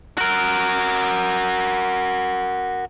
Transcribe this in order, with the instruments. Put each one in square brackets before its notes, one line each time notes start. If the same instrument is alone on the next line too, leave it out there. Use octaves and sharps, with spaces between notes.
[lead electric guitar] F#4 A#4